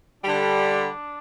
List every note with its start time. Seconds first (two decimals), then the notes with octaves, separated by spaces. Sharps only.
0.22 D3 G3 D4